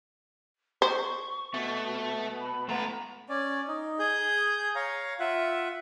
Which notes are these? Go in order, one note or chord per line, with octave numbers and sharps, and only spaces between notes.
C5 C#6
B2 A3
B5
G#3 A3 B4 F#5 A#5
C#4 D5
D#4
G#4 G6
C#5 F5 A#5
F4 E5 F#5